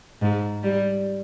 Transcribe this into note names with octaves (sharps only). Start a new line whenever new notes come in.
G#2
G3